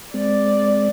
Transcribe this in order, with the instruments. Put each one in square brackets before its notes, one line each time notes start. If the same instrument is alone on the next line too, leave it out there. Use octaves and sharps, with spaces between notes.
[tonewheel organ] G#3 C4 [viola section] D5